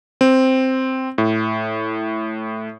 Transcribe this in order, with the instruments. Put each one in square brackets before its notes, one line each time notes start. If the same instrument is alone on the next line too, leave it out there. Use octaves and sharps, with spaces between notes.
[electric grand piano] C4
A2